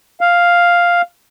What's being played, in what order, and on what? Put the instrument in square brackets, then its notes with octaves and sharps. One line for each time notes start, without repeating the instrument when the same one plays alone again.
[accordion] F5